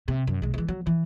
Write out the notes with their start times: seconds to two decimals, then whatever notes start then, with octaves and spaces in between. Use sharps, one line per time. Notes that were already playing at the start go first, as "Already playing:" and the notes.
0.08 C3
0.27 F#2
0.42 B1 G#3
0.54 E3 G#3
0.69 F#3
0.87 E3